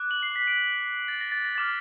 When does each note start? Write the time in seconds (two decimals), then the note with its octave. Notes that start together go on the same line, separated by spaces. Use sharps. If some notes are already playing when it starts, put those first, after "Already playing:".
Already playing: D6 F#6
0.11 F#7
0.23 C7
0.36 B6
0.47 D7
1.08 A6
1.21 A#6
1.32 A6
1.45 A#6
1.55 D6 F6 A6